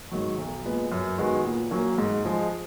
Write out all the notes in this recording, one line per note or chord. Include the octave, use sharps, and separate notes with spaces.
G#2 D#3 F#3
B1
A#2 G#3 B3
F#2
D#3 G#3 B3 F#4
A#2
F#3 A#3 C#4
G#2
F3 G#3